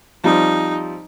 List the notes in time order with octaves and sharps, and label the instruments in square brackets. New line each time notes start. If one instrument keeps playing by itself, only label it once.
[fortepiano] F3 G3 C4 [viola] D#4